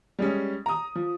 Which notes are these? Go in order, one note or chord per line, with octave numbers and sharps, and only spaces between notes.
G3 G#3 C#4
A#5 D#6
F3